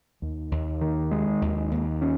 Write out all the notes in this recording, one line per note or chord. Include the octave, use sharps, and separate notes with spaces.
D#2
D#2
D#3
G#3
D#2
D#2
C#4